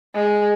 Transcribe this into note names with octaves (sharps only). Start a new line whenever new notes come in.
G#3